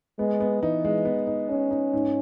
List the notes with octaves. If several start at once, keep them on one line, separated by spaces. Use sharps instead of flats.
G#3 B3
B3
E3 D#4
G#3
B3
D#4
B3 C#4
D#4
G#2